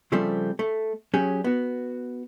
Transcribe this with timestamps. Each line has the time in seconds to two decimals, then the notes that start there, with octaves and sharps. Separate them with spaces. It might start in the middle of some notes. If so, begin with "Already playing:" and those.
0.12 C#3 F3 G3 A3 C4
0.59 A3
1.14 F#3 C#4 G4 G#4
1.44 B3 F#4